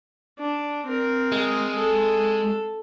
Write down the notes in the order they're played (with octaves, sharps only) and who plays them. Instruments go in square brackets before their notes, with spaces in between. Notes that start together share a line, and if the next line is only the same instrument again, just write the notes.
[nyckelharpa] D4
C4 A#4
[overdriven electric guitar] G#3
[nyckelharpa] A4